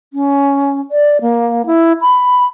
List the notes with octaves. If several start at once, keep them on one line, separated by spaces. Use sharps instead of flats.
C#4
D5
A#3
E4
B5